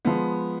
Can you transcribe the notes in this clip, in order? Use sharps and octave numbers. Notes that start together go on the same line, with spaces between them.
F3 G#3 B3